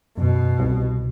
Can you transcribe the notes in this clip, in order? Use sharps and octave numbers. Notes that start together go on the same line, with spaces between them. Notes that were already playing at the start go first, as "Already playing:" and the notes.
F#1 B2
C2